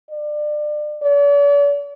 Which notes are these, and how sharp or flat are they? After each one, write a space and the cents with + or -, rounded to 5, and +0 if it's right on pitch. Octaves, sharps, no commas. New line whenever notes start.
D5 +30
D5 -45